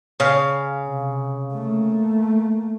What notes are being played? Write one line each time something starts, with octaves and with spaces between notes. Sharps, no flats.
C#3 F5
C3
A3 A#3